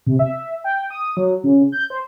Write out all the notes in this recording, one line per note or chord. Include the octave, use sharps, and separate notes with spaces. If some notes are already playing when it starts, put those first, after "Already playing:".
C3
E5
G5
D#6
F#3
C#3
G6
C5